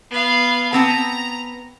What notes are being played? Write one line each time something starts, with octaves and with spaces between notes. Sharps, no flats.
B3 F5
B3 C4 A5 A#5